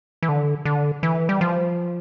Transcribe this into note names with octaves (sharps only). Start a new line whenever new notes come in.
E3
D3
D3
E3
G3
F3